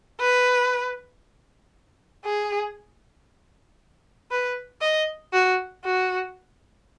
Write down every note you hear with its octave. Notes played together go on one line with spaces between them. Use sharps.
B4
G#4
B4
D#5
F#4
F#4